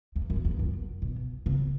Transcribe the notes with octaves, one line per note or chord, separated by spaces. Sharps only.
E2
F#2
E2
F#2
B2
C#3